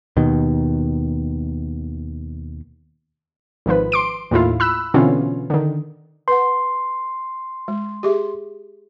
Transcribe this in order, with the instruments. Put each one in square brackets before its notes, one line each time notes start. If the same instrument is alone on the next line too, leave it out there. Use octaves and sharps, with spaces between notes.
[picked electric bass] D#2 B2 D#3
[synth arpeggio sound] G#1 D#3 F3 B4
C6 D6 D7
D#2 A2 E4 F4
B5 E6 F#6
B2 D3 E3 C4 C#4 F4
D3 D#3
[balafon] B4 F#5 [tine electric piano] C6
[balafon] G#3
G4 G#4 E5